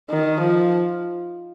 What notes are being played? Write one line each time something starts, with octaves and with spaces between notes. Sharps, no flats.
D#3
F3